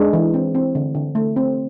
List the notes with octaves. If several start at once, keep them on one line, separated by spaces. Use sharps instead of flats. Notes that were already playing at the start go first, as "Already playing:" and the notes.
Already playing: G#3 D4
E3
C4
C4
D3
D3
A3
C4